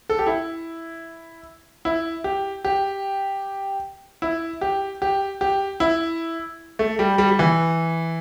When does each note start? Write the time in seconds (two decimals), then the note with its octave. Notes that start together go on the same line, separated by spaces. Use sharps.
0.10 A4
0.19 G4
0.27 E4
1.85 E4
2.24 G4
2.65 G4
4.22 E4
4.61 G4
5.02 G4
5.41 G4
5.80 E4
6.79 A3
6.99 G3
7.18 G3
7.31 G3
7.39 E3